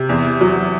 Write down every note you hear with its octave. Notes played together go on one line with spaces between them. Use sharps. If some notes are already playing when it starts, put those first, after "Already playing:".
Already playing: C3
E2
F#3